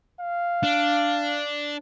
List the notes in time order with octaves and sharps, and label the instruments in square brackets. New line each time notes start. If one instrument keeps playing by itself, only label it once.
[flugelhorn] F5
[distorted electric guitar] D4